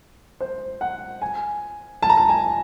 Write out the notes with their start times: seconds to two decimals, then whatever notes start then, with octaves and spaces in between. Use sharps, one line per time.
0.40 C5
0.81 F#5
1.22 G#5
2.03 A5
2.10 A#5
2.17 A5
2.29 G#5